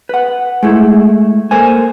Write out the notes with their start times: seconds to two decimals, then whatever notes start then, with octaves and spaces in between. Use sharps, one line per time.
0.09 B4 F#5
0.63 G#3 A3 E4
1.51 A#3 A4 A#4 C5 G#5